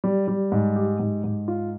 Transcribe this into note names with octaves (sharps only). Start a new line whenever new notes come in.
G3
G3
G#2
G4
G#2
G#2
F4